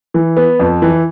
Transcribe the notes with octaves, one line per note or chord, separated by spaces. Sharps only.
E3
B3
F2
E3